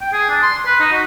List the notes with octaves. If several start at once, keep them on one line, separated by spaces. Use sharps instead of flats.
G5
G#4
D4
C6
B4
D#4
F#4